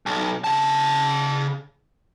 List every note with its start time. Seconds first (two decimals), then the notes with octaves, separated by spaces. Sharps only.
0.06 B1
0.44 C#3 A5